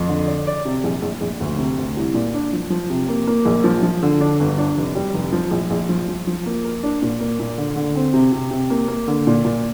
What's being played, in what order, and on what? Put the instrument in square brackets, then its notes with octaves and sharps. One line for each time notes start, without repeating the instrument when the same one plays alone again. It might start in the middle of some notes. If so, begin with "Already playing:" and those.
Already playing: [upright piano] F2
D3
D5
D5
C3
A#1
A#1
A#1
D2
C3
D2
C2
A#2
D4
F3
F3
C3
A#3
A#3
A#1
F3
F3
D3
D4
G1
D4
F1
G3
F1
F3
A#1
A#1
F3
F3
F3
A#3
A#4
D4
A#2
A#3
A#2
D3
D3
C4
C3
C3
C3
A#3
A#3
D3
A#2
A#2